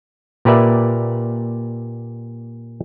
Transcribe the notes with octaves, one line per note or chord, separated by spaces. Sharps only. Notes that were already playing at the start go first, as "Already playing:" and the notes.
A#2 G4 A#4 B4 D5 E5